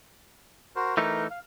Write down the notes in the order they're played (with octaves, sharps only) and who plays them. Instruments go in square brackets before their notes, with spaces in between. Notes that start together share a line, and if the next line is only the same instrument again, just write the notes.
[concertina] F#4 A#4 C5
[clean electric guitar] E3 A3 D#4 [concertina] A#4
[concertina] F5